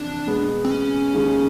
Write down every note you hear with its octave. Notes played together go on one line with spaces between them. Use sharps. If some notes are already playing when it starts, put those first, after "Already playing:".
Already playing: F2 C3 E3 D4
B2 G#3 B3
C4
C#4
D#2 D#3 G#3